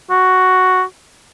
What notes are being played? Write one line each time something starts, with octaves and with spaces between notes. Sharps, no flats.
F#4